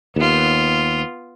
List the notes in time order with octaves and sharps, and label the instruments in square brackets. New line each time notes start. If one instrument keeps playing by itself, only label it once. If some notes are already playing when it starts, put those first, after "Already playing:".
[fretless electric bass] D#2 [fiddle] B3 F4